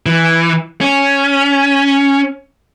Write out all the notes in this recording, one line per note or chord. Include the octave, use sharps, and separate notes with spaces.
E3
C#4